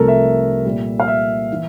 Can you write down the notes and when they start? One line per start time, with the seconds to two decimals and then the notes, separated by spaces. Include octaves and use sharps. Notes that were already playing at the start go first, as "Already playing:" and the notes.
Already playing: C2 C3 F3 A3 A4 A#4
0.08 E5
0.65 A#2 G3
1.00 F5
1.08 E5
1.52 E3